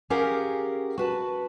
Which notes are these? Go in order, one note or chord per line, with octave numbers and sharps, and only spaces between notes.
C#4 G4 G#4 A#4 F5 F#5
F#4 B4 A5